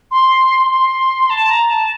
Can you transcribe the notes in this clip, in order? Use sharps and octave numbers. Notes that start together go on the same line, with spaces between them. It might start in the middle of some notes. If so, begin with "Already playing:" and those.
C6
C6
A5
A#5
A5